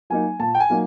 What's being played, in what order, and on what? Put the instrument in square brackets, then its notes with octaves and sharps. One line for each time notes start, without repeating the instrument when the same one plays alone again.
[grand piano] F#3 A#3 D#4 G#5
A#2 A5
G5
G#5
F#3 A#3 D#4